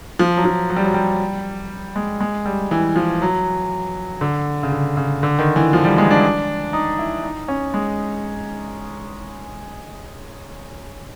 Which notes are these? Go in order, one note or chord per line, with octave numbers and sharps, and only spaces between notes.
F3
F#3
F3
F#3
G3
F#3
G3
G#3
G#3
G3
E3
F3
F#3
D3
C#3
D3
C#3
D3
D#3
E3
F3
G3
G#3
D4
D#4
E4
D#4
C#4
G#3